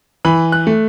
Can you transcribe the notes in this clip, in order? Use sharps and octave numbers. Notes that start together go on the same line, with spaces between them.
E3 B5
F#6
A3